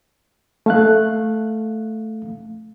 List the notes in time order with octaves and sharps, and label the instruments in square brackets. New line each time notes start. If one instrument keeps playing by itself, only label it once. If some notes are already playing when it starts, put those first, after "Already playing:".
[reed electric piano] A3 F5 F#6